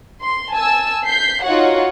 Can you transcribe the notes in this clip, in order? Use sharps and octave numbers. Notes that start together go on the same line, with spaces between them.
C6
G#5 A5 E6
G6 B6 C7
D#4 F4 F#4 C#5 F#5